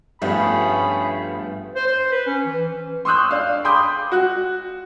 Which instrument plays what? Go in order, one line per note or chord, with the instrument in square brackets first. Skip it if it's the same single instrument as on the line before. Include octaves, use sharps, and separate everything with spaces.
[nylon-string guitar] G2 [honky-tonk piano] F3 A3 B3 [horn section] C#4 G#4 B5
[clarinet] C5
C5
B4
C#4
E3
[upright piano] C6 C#6 D#6 E6 F#6 G6
D4 F5
G5 B5 C6 D6 D#6 G6
F#4 F#6